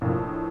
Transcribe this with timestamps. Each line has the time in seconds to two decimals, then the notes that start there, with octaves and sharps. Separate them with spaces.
0.01 A#1 A2 F3 A#3